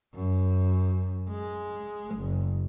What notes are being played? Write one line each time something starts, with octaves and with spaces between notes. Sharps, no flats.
F#2
G#3
F#1